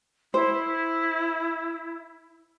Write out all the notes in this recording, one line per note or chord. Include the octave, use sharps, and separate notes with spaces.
E4 C5